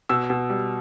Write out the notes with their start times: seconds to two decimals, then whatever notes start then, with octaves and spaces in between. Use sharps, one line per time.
0.09 B2 E6
0.30 B2
0.50 G3